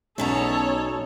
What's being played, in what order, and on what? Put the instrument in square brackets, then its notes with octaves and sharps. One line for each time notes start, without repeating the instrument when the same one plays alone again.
[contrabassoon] B1 [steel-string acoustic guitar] E2 B2 A#5 [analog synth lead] C#4 [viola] A4 C#5